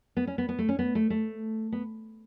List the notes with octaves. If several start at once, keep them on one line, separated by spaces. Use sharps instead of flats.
B3
C#4
B3
B3
A3
C#4
B3
A3
A3
B3